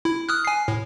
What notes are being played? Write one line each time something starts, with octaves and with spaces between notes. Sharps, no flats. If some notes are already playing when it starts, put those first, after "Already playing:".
E4
D#6 F6 F#6
G#5 C7
A2